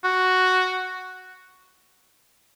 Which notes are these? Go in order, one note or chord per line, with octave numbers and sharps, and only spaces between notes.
F#4